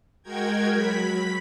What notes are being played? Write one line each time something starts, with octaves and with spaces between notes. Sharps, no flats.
G#3 F#4 A#4 G5 G#6
F#3 B5 B6